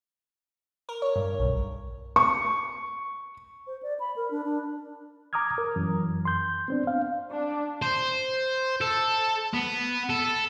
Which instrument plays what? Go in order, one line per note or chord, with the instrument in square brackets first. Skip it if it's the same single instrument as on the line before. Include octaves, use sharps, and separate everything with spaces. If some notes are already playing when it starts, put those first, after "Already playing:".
[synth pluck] A#4
C#5
G2
B1
[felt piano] C#6
[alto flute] C5
D5
B5
A#4
D4
D4
[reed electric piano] A#5 D6 D#6 F6 G#6
A#4
F#2 E3
C6 G6
B3 C4 D4
F5
[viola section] D4
[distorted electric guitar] C5
A4
B3
A4